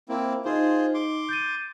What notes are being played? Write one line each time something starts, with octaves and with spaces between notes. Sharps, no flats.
A#3 C4 E4
D#4 F4 G#4 C5 D#5
C6 D6
G6 A6 D#7